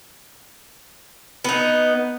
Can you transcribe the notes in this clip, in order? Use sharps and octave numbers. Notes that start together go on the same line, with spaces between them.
B3 D#4